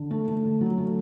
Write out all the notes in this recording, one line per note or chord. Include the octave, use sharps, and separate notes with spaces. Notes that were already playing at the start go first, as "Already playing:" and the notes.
Already playing: D3
A3
A3
D3
F#3
A3